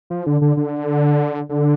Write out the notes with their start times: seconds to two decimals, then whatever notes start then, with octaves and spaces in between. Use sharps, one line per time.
0.10 F3
0.26 D3
0.41 D3
0.57 D3
1.49 D3